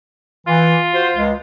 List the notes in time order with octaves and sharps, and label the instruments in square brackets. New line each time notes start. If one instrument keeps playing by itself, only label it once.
[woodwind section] E3 [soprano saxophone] F4
[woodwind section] F#4 C5
C#2 G#3